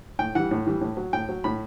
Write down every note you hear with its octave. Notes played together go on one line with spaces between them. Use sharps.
A2 G5
E3 G3 F#5
A2
E3 G3
A2
F#3
A2 G5
F#3
A2 B5